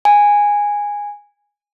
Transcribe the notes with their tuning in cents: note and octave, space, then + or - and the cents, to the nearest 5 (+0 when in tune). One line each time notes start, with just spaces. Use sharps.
G#5 -10